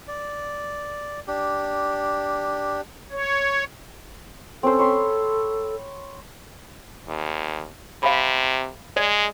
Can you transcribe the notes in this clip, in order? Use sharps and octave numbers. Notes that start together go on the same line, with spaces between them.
D5
D4 G4
C#5
C4 C#4 A4 C5
C#5 B5 C6
D#2
C3 F5 B5
G#3 D5